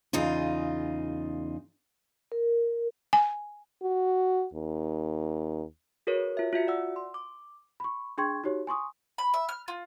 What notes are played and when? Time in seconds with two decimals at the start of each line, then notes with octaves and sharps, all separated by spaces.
0.13 E2 C#3 D#4 F4
2.32 A#4
3.13 G#5
3.82 F#4
4.54 D#2
6.07 F#4 G#4 A#4 B4 C#5
6.37 F4 E5
6.53 F4 F#4 E5 C#7
6.67 D5 F#5 E6
6.96 C6
7.14 D6
7.80 B5 C#6
8.18 D4 G#4 G5 C6 C#6 G#6
8.44 D#4 F#4 G4 C#5
8.67 G#5 C6 C#6 D#6
9.18 B5
9.34 E5
9.49 F6
9.68 F4